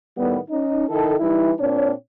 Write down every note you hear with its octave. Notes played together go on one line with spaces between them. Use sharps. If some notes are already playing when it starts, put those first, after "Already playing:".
A2 D#3 G3 B3
C#4 D#4
D#3 E4 A4
E3 G3 D#4 E4
A#2 C4 D4 C#5